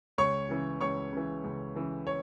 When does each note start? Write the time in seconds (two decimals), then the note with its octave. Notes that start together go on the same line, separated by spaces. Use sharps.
0.18 C#2 C#5 C#6
0.49 C#3 E3
0.81 C#2 C#5 C#6
1.12 C#3 E3
1.44 C#2
1.75 C#3 E3
2.07 C#5